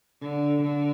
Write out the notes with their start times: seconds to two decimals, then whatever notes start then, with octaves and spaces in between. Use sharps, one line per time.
0.21 D3
0.62 D3